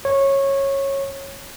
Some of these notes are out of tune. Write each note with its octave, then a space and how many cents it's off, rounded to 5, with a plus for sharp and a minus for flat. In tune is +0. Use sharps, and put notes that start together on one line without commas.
C#5 -15